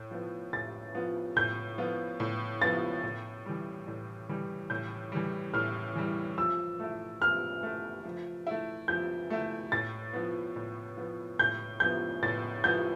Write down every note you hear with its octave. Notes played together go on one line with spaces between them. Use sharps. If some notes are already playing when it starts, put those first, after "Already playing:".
Already playing: A2
F3 B3 F4
A2 A6
F3 B3 F4
A2 G6
F3 B3 F4
A2
F3 B3 F4 A6
A2
E3 G3
A2
E3 G3
A2 G6
E3 G3
A2 F6
E3 G3
F3 E6
A3 E4
F3 F6
A3 E4
F3
A3 E4
F3 G6
A3 E4
A2 A6
F3 B3
A2
F3 B3
A2 G6
F3 B3 G6
A2 A6
F3 B3 G6